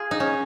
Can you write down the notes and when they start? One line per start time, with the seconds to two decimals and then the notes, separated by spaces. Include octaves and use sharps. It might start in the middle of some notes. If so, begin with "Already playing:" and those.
Already playing: F4 G#4
0.11 D#4
0.20 C#4